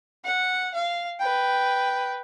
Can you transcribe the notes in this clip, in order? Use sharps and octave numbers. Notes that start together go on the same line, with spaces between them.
F#5
F5
B4 G5